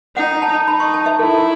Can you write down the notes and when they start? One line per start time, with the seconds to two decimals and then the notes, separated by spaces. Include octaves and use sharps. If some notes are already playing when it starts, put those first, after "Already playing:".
0.16 D#4 F#5
0.42 A5
0.67 D#4 B5
0.80 C#6
0.94 A5
1.06 E5
1.19 E4 A4